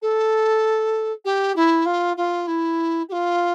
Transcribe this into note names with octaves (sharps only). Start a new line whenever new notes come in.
A4
G4
E4
F4
F4
E4
G4
F4